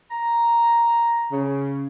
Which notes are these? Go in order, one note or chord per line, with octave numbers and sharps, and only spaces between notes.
A#5
C#3